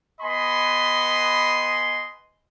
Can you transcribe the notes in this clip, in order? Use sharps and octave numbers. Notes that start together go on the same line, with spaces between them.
B3 D#5 G#5 B5 C6